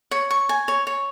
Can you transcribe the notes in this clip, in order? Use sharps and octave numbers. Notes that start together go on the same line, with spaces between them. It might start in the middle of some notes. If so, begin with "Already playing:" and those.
C#5
C#6
G#5
C#5
C#5